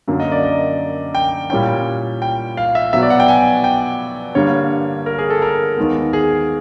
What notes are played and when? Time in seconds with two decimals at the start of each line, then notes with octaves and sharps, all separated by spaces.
0.08 F#2 D3 F#3 A#3
0.20 D#5
0.32 D5
0.43 D#5
1.15 G5
1.50 A#2 G3 A#3 C#4 E4 G5
2.22 G5
2.57 F5
2.75 E5
2.93 B2 F#3 B3 E5
3.02 D5
3.10 F#5
3.20 G5
3.28 G#5
3.64 G5
4.35 G2 D3 G3 A#3 C#5
5.06 A#4
5.18 G#4
5.30 A4
5.42 A#4
5.77 D#2 D#3 G#3 B3
6.13 G#4